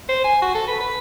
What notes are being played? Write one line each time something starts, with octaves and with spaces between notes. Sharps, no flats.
C5
G#5
F#4
A4
B4
B4